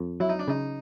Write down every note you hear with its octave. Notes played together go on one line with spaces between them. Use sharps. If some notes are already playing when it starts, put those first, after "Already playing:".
Already playing: F2
F#3 E4
D#4
D4
C#3 D#4